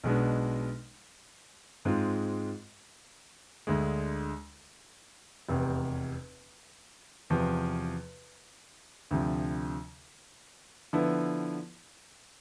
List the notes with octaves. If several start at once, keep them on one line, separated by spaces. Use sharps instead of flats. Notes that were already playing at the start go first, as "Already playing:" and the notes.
B1 B2 G#3 B3 D4
G#2 G#3 C4 F4
D2 D3 G#3
F1 E2 C3
E2 C3 F3
D2 C3 F3
D3 F3 B3 E4